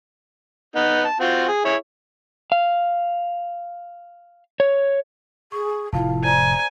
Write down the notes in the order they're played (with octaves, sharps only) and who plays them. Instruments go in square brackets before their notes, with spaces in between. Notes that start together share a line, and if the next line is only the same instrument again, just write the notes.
[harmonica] B3 D#4 B4
A5
C4 F4 F#4
G#4
E4 G#4 C#5
[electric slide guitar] F5
C#5
[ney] G#4 [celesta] C#6
[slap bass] F1 A2 [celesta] E4 F4 A5 [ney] F5
[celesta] C5 D5 G#6 [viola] G#5 [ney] A#5